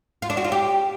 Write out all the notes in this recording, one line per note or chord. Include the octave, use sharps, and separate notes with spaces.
F4
D4
F#4
F4
G4